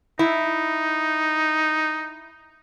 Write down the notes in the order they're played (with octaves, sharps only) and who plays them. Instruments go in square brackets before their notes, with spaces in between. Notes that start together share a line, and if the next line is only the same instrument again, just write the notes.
[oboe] D#4 [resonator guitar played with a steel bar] E4